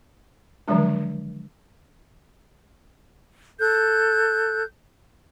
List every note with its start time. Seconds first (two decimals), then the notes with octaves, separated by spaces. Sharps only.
0.68 D3 D#3 F3 F#3 G#3 D4
3.60 A4 F#6 G6